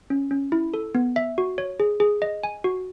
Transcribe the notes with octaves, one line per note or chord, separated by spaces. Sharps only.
C#4
C#4
E4
A4
B3
E5
F#4
C#5
G#4
G#4
D#5
G#5
F#4